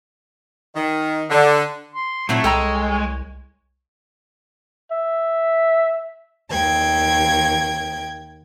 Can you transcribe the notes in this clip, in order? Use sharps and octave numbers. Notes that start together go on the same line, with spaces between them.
D#3
D3
C6
A#2 F#3 A3 C4 E4 C#5
C2 G#3 A4 G5 A#5
E5
D#2 G5 G#6